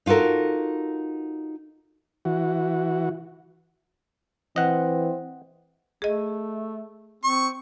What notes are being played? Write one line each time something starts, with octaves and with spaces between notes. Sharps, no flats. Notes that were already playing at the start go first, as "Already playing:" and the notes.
D#4 F4 F#4 A4 A#4
E3 F#4
E3 C4 D#5 F#5
A3 G#4 D#5
C4 C#6